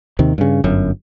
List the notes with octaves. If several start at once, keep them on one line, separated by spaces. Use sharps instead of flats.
D#2 C3 D#3
G2 C#3
G1 F#2